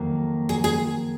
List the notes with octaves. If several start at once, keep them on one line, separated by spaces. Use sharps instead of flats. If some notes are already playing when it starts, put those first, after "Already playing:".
Already playing: F2 D#3 F#3 A#3
G#4
G#4